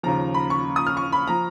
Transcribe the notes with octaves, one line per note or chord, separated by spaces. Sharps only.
D#2 C#3 F3 A#5
B5
C#6
D#6
F6
C#6
B5
F3 A#5